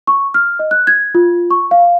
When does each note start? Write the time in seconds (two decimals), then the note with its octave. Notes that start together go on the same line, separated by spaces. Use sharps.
0.07 C#6
0.34 F6
0.59 D#5
0.71 F#6
0.87 G#6
1.15 F4
1.51 C#6
1.71 F5